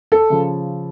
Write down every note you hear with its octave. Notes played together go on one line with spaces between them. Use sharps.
A4
C#3 F3